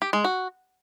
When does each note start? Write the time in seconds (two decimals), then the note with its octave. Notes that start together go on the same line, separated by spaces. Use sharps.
0.02 G4
0.13 G#3
0.24 F#4